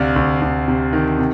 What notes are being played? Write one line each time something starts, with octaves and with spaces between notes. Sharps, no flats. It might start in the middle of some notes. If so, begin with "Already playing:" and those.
Already playing: D2 C3 D5 F5
D2
D2
C3
D#3
C3